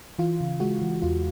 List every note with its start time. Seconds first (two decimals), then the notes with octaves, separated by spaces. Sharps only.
0.19 E3 F4
0.41 C#3
0.60 G#3 F#4
0.82 E3
1.02 E2 F4